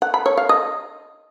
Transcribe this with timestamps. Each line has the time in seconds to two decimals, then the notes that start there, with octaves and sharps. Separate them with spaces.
0.02 F#5
0.14 B5
0.26 C#5
0.37 F5
0.49 D#5